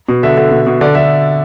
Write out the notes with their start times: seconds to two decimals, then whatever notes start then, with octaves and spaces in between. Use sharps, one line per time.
0.09 B2
0.23 D3 E5
0.37 D3
0.51 B2
0.67 B2
0.81 D3 D5
0.95 D3 E5